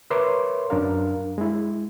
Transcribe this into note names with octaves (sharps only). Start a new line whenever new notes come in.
A#4 B4 C#5 E5 C6 D6
F#2 D4 A#4 F5
G#3 E4